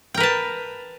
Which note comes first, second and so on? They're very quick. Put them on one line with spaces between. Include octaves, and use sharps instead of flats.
G5 A#4 B4 A5